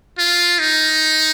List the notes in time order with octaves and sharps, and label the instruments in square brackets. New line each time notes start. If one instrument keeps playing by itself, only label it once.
[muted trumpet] F4
D#4